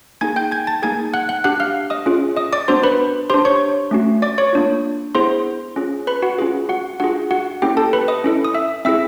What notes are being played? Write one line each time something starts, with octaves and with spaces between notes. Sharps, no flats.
A#3 D#4 G#4 G#5 G#6
G5 G6
G#5 G#6
A5 A6
A#3 D#4 G#4 G#5 G#6
F#5 F#6
F#5 F#6
D4 G4 F#5 F#6
F5 F6
D#5 D#6
C#4 F4 G#4
D#5 D#6
D5 D6
B3 D4 F#4 C5 C6
B4 B5
D4 G4 C5 C6
C#5 C#6
A3 C#4 F#4
D5 D6
C#5 C#6
A#3 D4 F4
B3 E4 G#4 C5 C6
C#4 F4 G#4
B4 B5
F#4 F#5
C#4 F4 G#4
F#4 F#5
D4 F4 F#4 G#4 F#5
F#4 F#5
A#3 C#4 E4 G4 A4 G5
A4 A5
B4 B5
D#5 D#6
C#4 E4 A4
D#6
E5 E6
C4 E4 G#4 E5 E6